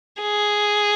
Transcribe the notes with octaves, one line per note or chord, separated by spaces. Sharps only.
G#4